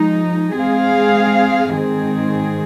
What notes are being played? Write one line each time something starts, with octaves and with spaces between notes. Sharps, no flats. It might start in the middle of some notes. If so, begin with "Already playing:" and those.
Already playing: F3 G#3 D#4
G#3 C4 G#4 F5
G#2 D#3 C4 G#4